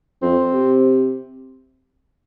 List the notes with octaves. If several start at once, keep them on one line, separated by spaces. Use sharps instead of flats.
F2 C4
C3